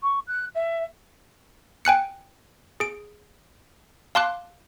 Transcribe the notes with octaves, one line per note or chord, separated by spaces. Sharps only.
C#6
F#6
E5
G5 G#5 F#6 C#7
G#4 D7
F5 A5 C6 D6 F#6